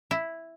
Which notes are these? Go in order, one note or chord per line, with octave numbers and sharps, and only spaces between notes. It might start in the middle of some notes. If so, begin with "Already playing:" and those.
E4